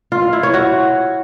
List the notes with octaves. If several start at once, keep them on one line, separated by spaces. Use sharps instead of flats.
F4
F5
E4
C#5
F#4